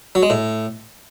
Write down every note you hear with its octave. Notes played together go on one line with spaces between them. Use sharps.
F#3
G#3
A2